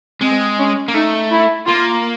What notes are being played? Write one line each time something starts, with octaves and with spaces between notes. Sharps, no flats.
G#3 C4
C#4
A#3
A3 D#4
E4
A#3 F4